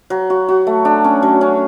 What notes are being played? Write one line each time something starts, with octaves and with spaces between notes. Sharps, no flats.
F#3
F#4
F#4
A3
D4
C#4
F#3
C#4